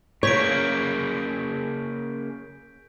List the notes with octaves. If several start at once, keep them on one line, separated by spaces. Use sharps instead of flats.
C#3 A#3 C#5 G6 B6 D7